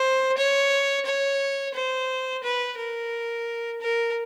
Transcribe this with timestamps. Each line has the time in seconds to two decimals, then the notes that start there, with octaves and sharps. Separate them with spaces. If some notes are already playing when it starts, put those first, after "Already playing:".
Already playing: C5
0.37 C#5
1.06 C#5
1.74 C5
2.43 B4
2.78 A#4
3.81 A#4